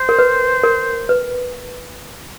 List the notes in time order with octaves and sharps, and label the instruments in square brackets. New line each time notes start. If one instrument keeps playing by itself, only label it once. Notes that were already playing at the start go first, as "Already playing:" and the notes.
Already playing: [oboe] C5
[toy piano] A#4
B4
A#4
B4